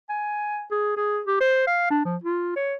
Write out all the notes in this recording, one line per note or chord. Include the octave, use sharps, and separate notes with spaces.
G#5
G#4
G#4
G4
C5
F5
D4
F3
F4
C#5